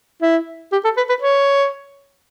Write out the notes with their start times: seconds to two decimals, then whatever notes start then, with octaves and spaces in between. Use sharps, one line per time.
0.22 E4
0.72 G4
0.84 A4
0.97 B4
1.09 B4
1.22 C#5